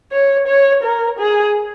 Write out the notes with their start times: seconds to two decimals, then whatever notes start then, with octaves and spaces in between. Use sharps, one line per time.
0.12 C#5
0.47 C#5
0.83 A#4
1.19 G#4